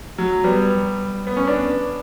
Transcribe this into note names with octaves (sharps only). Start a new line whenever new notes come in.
F#3
G3 B3
B3
C#4
B3 D4